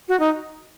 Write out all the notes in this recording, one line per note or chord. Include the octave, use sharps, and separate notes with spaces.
F#4
D#4